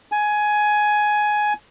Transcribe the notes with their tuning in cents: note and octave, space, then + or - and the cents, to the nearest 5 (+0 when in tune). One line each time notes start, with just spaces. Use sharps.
G#5 +15